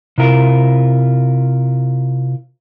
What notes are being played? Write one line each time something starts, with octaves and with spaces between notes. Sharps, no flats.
C3 E4 F4 A#4